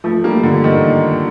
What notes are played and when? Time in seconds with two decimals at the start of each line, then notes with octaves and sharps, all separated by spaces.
0.04 F3 A3
0.24 G3 A#3
0.43 D3
0.64 D#3